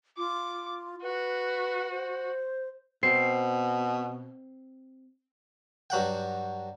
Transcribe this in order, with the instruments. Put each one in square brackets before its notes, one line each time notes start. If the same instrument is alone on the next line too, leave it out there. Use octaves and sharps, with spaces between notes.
[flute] F4 [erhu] D6
[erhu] F#4 [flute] B4
[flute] C5
[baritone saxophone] B2 [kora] C4 [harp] C7
[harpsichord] G2 F#3 F#5 G5